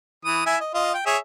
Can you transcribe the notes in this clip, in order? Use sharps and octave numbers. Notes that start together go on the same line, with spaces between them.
E3 D#6
E4 E5 G#5
D#5
F4 D#5
G5
G#4 C#5 E5